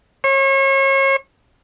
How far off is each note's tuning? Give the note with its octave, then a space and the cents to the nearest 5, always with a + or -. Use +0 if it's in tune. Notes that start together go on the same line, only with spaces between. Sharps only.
C#5 -35